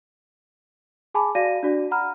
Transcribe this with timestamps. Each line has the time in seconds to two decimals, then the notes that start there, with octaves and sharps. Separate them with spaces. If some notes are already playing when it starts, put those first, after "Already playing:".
1.14 G#4 G#5 A5 B5 D6
1.35 F#4 D5 F5 A#6 D#7
1.63 D4 F#4 D5
1.91 F#5 A#5 B5 F6